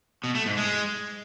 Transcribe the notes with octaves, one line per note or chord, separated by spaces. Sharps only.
B2
A3
G#2
G#3